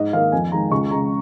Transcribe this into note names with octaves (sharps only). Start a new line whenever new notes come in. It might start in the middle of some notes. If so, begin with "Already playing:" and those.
Already playing: G#2 D#5
D#3 A#3 F5
F2 G#5
D#3 G#3 A#5
C#2 C#6
C#3 G#3 A#5